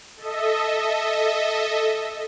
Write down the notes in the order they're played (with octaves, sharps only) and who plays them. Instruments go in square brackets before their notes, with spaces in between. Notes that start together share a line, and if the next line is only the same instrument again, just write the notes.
[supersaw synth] A4 D#5 E5